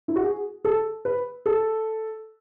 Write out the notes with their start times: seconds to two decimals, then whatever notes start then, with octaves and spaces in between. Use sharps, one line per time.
0.08 E4
0.16 F#4
0.23 G#4
0.65 A4
1.05 B4
1.46 A4